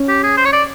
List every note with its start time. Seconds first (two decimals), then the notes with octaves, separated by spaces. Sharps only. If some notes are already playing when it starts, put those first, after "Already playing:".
Already playing: C#4
0.09 G4
0.23 G#4
0.37 C5
0.45 C#5
0.53 D5